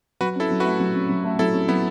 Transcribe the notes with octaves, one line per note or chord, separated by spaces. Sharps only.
F#3 F#4 B4
C#4 E4 A4
F#3
A3 F#4 B4
F#3
C#4
F#3
A3
F#3 E4 A4
C#4
F#3 B3 E4